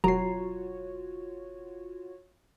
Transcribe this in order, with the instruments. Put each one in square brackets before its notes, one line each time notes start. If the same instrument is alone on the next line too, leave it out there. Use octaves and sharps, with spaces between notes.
[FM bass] E1 [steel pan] F#3 [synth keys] F4 F#4 C#5 [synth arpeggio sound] A#5 C7